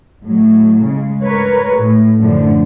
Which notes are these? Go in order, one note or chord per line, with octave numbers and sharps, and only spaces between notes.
A2 F#3
C#3 G#3
A#4 B4 C#5
A2
F#2 A2 D3 F3